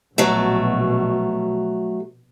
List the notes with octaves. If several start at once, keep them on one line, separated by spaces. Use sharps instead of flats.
A#1 B2 F#3 A3